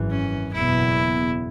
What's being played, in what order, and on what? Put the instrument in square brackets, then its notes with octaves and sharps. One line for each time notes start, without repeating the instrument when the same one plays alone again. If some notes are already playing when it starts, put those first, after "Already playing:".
Already playing: [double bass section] G#1 F#2 E3
[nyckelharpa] C#4
[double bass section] F#1 E2 B2 B3 [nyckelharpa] E4